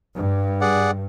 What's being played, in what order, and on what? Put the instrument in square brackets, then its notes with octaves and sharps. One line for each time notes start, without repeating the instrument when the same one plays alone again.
[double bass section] G2
[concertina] G#4 D5 F#5